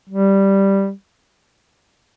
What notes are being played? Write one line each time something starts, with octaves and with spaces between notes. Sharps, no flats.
G3